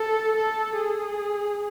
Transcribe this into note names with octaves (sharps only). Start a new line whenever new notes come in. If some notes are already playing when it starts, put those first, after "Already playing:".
Already playing: A4
A4
G#4